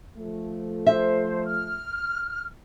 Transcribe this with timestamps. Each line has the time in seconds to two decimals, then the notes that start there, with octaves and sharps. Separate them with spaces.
0.17 F3 A3
0.87 C5 E5
1.45 F6